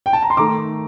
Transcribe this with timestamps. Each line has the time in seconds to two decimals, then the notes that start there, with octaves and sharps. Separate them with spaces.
0.06 G5
0.13 A5
0.22 A#5
0.30 C6
0.37 D#3 A3 A#5 D6